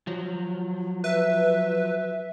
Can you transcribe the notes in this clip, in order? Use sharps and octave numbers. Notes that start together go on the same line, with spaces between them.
F3 F#3
B4 E5